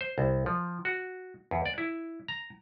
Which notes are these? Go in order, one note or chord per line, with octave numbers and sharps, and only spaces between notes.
C5
C2
F3
F#4
E2
D5
E4
A#5